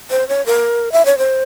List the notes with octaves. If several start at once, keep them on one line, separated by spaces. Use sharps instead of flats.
C5
C#5
A#4
E5
C#5
C5